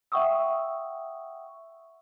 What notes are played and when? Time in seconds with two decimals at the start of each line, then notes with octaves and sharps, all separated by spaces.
0.12 E5 F#5 G5 C#6 D#6 E6